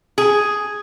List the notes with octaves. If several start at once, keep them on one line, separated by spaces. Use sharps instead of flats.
G#4